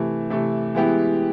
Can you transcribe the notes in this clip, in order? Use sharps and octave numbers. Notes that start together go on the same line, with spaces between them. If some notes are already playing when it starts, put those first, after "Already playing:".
Already playing: C3 E3 A3
C3 E3 A3
E3 G#3 B3 E4 G4